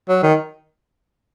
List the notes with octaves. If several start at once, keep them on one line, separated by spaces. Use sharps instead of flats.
F#3
D#3